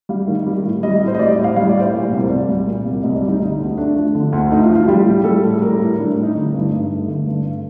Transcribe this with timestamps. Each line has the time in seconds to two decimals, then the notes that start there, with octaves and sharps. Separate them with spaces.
0.09 G3 F5
0.28 D#3
0.46 G3
0.64 A2
0.83 G3 D#5
1.01 A2
1.08 C5
1.15 D#5
1.19 G3 D5
1.38 A2
1.44 F5
1.56 G3 F5
1.69 D5
1.75 A2
1.81 C5
1.93 A#2
2.12 C2
2.30 C2 D5
2.48 G3
2.66 A#2
2.86 C2
3.03 C2 D#5
3.16 D5
3.22 G3
3.28 D#4
3.40 D3 D#4
3.59 D2
3.77 A3 D4
3.96 F3
4.15 D3
4.33 D2
4.51 A3 D#4
4.63 F4
4.69 F3
4.75 F4
4.88 G3 G4
5.06 A2
5.24 G3 A4
5.44 A2
5.62 G3 A#4
5.80 A2
5.98 G3 D4
6.16 A2
6.23 D#4
6.35 D3
6.54 G2
6.72 G2 D#4
6.90 A3
7.08 D3
7.27 G2